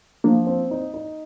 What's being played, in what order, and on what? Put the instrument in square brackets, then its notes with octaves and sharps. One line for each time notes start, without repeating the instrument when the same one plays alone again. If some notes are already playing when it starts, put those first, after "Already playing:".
[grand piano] F3 [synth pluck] A#3 D4
[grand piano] C4
D#4
D#4